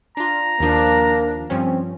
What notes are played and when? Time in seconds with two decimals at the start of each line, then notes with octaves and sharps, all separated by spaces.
0.17 D4 F4 A#5
0.60 D#2 F3 A#3 D4
1.50 G2 F3 C4 C#4